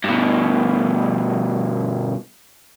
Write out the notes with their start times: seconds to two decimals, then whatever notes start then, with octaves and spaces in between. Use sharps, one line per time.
0.04 G2 B2